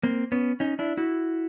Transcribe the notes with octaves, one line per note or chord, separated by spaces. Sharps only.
A#3 C4
B3 C#4
C#4 D#4
D4 E4
E4 F#4